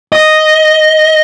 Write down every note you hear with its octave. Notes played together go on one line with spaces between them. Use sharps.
D#5